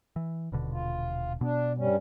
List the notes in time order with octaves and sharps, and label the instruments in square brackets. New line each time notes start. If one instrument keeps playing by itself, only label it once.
[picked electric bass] E3
D#1 B2 D3
[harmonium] F4
[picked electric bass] B2 B3 [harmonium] D4
[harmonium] G2 G3 C#4